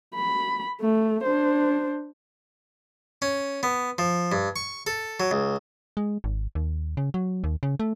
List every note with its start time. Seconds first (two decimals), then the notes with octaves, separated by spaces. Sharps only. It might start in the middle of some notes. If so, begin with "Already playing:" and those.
0.15 B5
0.81 A3
1.23 D4 C5
3.22 C#4
3.63 B3
3.98 F3
4.32 G2
4.56 C#6
4.87 A4
5.20 F#3
5.31 C#2
5.97 G#3
6.24 G#1
6.55 D#2
6.97 C#3
7.14 F#3
7.44 D#2
7.63 C#3
7.80 A3